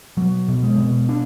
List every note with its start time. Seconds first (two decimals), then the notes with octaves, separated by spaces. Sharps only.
0.17 B2 F#3
0.48 B2
0.63 G#3
0.78 B2
1.09 D4